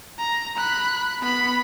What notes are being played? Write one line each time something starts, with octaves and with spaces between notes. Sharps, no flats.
A#5
B5 F#6
B3 B5